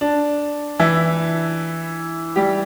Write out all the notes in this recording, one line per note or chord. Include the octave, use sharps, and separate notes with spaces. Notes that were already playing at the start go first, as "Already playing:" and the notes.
D4
E3 E4
G3 G4